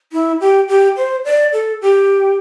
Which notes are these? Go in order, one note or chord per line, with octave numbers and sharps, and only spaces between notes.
E4
G4
G4
C5
D5
A4
G4